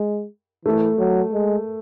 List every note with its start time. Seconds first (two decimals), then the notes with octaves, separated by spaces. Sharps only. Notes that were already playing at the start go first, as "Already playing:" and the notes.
Already playing: G#3
0.65 E3 A3
0.98 F#3
1.33 G#3